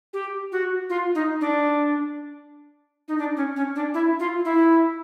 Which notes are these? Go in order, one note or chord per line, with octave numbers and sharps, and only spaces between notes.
G4
F#4
F4
D#4
D4
D#4
D4
C#4
C#4
D4
E4
F4
E4